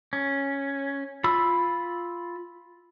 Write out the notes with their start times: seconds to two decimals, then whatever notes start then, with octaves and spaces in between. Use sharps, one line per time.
0.13 C#4
1.24 F4 B5 E6